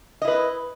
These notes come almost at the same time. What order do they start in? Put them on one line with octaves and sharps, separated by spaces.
D#5 E4 B4